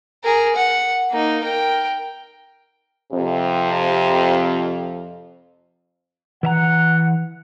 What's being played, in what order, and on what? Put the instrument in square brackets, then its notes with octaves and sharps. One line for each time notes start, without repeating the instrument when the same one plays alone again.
[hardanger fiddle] G#4 A#4
F#5
A#3 D#4
A#4 G5
[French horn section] F2 C3
[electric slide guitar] E3 E5 A#5 [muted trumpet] F#5